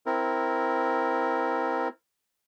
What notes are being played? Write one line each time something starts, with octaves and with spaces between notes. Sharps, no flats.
C4 E4 A#4